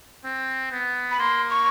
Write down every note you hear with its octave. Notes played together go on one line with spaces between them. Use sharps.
C4
B3
B5
A#3 C6
C#6